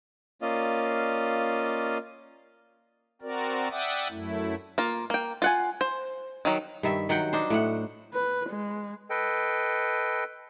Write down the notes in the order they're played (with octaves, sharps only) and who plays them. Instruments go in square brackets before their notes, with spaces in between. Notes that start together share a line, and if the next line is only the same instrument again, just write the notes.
[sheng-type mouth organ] A#3 C#4 F4 D5 D#5 F5
[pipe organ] C4 F#4 A#4 D5
D5 E5 F#5 G5 D6 D#6
F#2 A3 E4
[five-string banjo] A#3 F4
A#3 G5
F4 F#5 G#5
C5
D#3 F#3
[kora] G2 D#3 E5
D#3 F#3 F#5 G5
D4 D#4 C5
A2 A3 F#5
[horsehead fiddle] B4
G#3
[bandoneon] A4 B4 D#5 G5